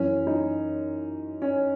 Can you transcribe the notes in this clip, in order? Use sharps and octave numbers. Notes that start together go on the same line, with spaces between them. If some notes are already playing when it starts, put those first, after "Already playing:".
Already playing: F#2 E3 C#4
D#4
C#4